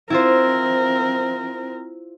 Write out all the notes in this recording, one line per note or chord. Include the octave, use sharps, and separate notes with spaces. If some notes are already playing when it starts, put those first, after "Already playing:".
C4 E4 F4 A#4 C5